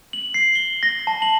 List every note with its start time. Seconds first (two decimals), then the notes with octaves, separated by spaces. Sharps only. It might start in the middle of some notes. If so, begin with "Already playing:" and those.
0.13 F#7
0.34 C7
0.55 G7
0.83 A#6
1.07 A5
1.22 F#7